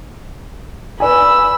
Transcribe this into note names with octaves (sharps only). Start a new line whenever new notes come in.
B4 D5 G#5 B5 E6